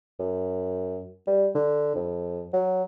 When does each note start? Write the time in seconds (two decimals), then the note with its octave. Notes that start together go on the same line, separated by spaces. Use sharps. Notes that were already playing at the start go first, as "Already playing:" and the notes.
0.20 F#2
1.27 G3
1.55 D3
1.96 F2
2.53 F#3